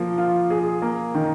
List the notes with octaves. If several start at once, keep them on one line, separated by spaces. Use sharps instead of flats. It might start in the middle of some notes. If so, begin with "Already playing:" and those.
Already playing: F3 A#3
F4
G#4
A#3
D#3